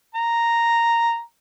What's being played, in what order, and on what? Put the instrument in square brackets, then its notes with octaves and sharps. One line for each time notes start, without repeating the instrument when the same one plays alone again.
[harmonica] A#5